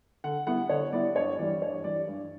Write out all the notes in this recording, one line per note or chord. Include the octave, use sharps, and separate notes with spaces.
D3 F#5
G3 B3 E4 F#5
D3 C#5
G3 B3 E4 D5
G2 C#5
E3 G3 D5
G2 C#5
E3 G3 D5
G2